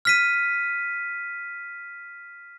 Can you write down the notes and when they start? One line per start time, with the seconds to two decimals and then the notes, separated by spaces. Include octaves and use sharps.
0.05 F6 B6 D#7